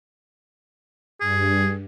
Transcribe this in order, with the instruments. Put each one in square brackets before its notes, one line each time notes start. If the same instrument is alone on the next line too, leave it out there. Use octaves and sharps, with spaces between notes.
[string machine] G2 [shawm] G#4